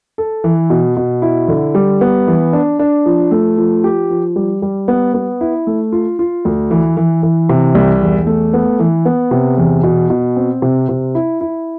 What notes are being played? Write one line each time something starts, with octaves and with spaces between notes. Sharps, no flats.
A4
E3
B2
B2
E4
D3
G3
B3
E3
D4
D4
F3
A3
F3
G4
F3
G3
G3
B3
B3
E4
A3
F4
F4
D2
E3
E3
E3
C3
C2
E2
A3
B3
E3
B3
C3
E2
B2
B2
C4
C3
C3
E4
E4